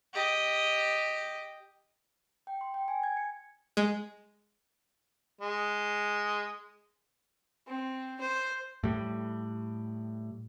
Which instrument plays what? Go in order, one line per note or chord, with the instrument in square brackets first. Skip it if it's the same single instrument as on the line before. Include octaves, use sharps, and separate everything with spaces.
[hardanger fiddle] G4 D#5
[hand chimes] G5
C6
G5
G#5
G#6
C#7
[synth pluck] G#3
[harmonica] G#3
[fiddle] C4
C5
[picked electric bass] A2 G3